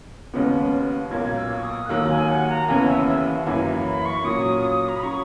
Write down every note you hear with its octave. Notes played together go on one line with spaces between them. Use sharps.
D#2 C#3 G#3 B3
B1 A#2 A#3 G#6
E6
C#6
D#6
F#6
D#2 D#3 F#3 A#3 E6
G#5
F#5
A#5
D#2 C#3 E3 B3 G#5
E5
E5
F#5
F#2 E3 A#3 E4 G#5
A#5
B5
C#6
A#2 F#3 C#4 D#6
A#5
B5
F#3 C#4 C#6